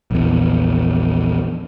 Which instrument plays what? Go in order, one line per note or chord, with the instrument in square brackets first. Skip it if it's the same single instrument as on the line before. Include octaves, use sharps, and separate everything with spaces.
[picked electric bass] A#1 E2